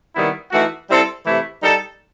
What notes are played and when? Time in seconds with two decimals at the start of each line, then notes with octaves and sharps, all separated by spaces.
0.16 C3 D#3 G3 B3 E4
0.51 E3 A3 D#4 F#4
0.89 G3 C4 E4 A4
1.26 C3 E3 A3 E4
1.62 G3 D#4 A4